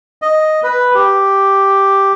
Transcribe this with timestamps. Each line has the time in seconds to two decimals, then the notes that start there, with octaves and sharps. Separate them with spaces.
0.22 D#5
0.63 B4
0.95 G4